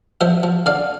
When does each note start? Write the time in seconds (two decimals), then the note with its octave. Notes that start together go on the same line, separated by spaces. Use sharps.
0.21 F3 C5 E5
0.43 F3
0.66 D3 D5 F5